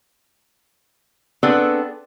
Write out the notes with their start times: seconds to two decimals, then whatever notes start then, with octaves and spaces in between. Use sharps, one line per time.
1.43 B3 C4 D4 G#4 A4 B4